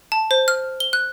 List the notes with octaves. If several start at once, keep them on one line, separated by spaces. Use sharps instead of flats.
A5
C5
F6
G7
F#6